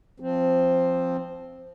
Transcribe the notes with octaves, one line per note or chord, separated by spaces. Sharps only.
F3 C4